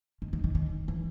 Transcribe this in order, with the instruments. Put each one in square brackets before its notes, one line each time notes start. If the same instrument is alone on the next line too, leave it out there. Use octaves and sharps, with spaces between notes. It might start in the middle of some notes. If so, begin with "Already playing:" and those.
[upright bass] D#3
D#3
D#3
D#3
E3